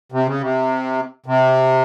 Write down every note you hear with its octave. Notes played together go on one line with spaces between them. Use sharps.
C3
C#3
C3
C3